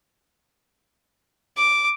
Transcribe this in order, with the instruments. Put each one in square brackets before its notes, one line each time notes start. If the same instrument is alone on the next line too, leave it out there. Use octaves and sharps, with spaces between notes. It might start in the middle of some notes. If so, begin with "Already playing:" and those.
[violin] D6